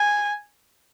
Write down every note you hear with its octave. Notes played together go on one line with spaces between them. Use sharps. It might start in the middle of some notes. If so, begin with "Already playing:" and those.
Already playing: G#5